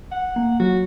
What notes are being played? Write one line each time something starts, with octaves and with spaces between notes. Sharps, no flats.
F#5
A#3
F#3 F#4